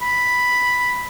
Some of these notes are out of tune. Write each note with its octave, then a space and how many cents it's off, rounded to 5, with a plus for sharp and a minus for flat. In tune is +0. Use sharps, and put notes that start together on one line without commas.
B5 +0